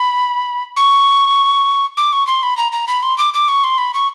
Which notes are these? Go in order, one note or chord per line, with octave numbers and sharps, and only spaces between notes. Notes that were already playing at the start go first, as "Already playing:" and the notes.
Already playing: B5
C#6
D6
C#6
C6
B5
A#5
A#5
B5
C6
D6
D6
C#6
C6
B5
C#6